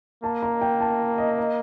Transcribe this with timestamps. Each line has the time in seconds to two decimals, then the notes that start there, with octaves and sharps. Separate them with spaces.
0.23 A#3 A5
0.43 A#5
0.61 G5
0.81 A5
1.18 D#5
1.38 D#5